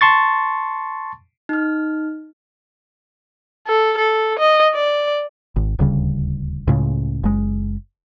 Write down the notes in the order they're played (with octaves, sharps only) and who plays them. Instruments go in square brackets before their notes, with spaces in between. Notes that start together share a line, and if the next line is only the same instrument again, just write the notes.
[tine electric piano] A5 C6 C#6 A6
[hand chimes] D#4 F6
[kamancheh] A4
A4
D#5
D5
[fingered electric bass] G#1
D#1 D2 C#3 G3
C#2 A2 C#3
F#1 G#3